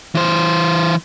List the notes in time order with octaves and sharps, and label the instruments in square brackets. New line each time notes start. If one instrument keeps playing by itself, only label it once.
[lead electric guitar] E3 C5